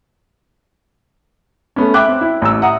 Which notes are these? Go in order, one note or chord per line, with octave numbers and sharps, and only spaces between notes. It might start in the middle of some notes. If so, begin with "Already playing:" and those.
A3 B3 C#4
E5 G5 B5 D6 F#6
C4
E4
A1 A#5 E6
E5 F#5 A#5 D#6